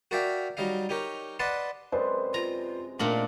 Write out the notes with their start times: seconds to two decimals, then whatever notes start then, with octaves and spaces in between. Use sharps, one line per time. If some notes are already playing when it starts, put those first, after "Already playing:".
0.11 F#4 A#4 D5 E5 F5 G5
0.57 F#3 G3 D#4 D#5 F5
0.89 D#4 G4 A#4 C#5
1.39 B4 D5 D#5 F#5 A5 C6
1.92 F#2 C3 G#3 B4 C5 D5
2.34 F4 A#5
2.99 A#2 D#3 A3 A#3 D4 F4 F#7